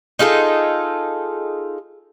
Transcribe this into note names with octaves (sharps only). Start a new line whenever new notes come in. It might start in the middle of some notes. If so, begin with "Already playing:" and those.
D#4 F4 G#4 A4